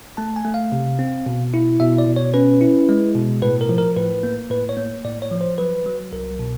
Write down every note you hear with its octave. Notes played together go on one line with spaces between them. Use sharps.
A3 A5
G#5
A3
F5
C3
C4
B2
E4
B2 E5
D5
B2
C#5
C#4 B4
E4
G#3
B2
A2 B4
A#4
F3
A#4
A2 B4
A#3
A2 B4
C#5
A#3
A2 D5
C#5
F3
C5
F#3 B4
F#3
C2 A#4
B2